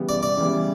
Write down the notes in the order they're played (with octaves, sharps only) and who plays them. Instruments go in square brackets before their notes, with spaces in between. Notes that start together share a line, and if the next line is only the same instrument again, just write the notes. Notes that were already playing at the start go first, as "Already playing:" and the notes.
Already playing: [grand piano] C#3 E3 G3 B3
[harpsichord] D5
D5
[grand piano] C#3 E3 G3 B3